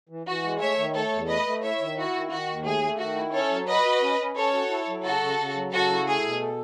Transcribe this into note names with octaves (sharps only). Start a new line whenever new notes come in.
E3
E3 F#4
G#3
A3 C#5 E5
D#3
A3 A4 C#5
E2
A3 B4 D#5
A3
E4 C#5 E5
D#3
E4 F#4
D#3
D#3 F#4
D#2
A3 G#4
A3
D#3 F#4
E4
C#4 A4 C#5
F#3
F#4 B4 D#5
F#4
C#4
C#4
C#4 A4 C#5
F#4
E4
F#3
C#3 F#4 A4
C#3
C#3
F#3
C#3 F#4 A4
E4
A3 G#4
B2
A4